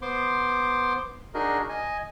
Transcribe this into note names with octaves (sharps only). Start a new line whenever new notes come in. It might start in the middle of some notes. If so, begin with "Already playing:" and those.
B3 C5 C6 D6
D4 D#4 F#4 G#4 A#4 D#5
D#5 G#5